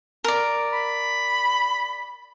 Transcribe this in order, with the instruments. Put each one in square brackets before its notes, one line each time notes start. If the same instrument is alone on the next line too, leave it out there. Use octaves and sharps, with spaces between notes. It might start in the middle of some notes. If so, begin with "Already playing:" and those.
[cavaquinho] A#4 D5
[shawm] B5